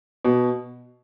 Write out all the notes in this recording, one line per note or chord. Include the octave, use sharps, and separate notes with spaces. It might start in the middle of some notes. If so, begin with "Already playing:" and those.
B2